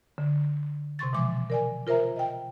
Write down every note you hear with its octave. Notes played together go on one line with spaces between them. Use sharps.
D3
C3 C6 C#6 A6
B2 E3 F3 G#3 D6
A#4 D5 G#5
F4 A#4 C5 E5 A#5
D#5 G5